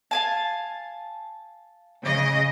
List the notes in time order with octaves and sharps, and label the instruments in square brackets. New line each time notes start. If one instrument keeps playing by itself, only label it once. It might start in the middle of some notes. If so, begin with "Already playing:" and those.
[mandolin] F5 G#5 A5
[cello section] C#3 D#5